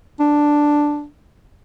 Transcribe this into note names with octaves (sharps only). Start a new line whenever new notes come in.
D4